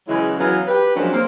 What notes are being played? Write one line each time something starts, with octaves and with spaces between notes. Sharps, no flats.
C#3 E3 F#3 G#3 C#4 E4
E3 F#3 B3 C#4 F5
G4 B4
F3 F#3 G#3 A#3 C#4 D4
A#3 C4